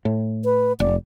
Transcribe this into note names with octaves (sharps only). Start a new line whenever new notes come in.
A2
B4
F1 D5